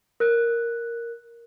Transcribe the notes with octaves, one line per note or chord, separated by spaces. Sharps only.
A#4 F#6